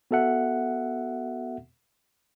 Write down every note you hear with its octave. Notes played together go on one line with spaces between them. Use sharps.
B3 F#4 A4 E5 F#5